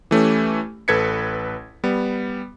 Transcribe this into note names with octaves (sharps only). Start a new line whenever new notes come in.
E3 A3 C#4 G4
A1 A4 B4 G#6 B6 C#7
G3 B3